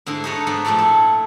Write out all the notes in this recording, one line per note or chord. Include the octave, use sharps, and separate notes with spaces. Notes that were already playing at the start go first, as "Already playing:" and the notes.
G#2 D3 E4 G#4 C6
D#4 G#4 A4 B4 C#5
G#2 B3 D4
A#2 F3 A3 A4 D5
E4